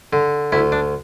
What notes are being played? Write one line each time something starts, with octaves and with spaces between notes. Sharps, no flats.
D3
D2 E4
D4